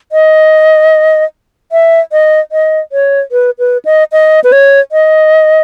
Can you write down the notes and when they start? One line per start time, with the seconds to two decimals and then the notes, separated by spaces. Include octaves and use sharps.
0.12 D#5
1.72 E5
2.12 D#5
2.52 D#5
2.92 C#5
3.32 B4
3.59 B4
3.85 D#5
4.12 D#5
4.44 B4
4.52 C#5
4.92 D#5